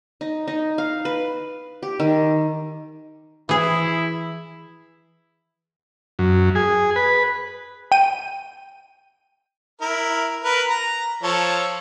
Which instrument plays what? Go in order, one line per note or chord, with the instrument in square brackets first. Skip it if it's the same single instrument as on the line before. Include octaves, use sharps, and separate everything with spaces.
[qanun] D#4
D#4
F5
B4
G4
D#3
[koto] E3 G#4 [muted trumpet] E4
[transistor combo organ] F#2
G#4
B4
[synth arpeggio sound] G5 D#7
[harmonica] E4 A#4
A#4 B4
A#5
F3 A4 C#5